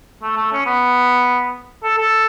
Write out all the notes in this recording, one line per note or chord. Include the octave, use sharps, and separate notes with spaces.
A3
A3
C#4
B3
A4
A4